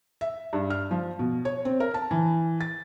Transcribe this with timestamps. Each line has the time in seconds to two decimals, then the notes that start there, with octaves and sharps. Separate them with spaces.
0.21 E5
0.53 G2
0.70 F6
0.91 F3
1.19 B2
1.45 C#5
1.65 C4
1.80 A#4
1.94 A5
2.11 E3
2.61 A6